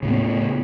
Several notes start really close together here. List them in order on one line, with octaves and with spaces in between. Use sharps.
C#3 A2 C#4 B3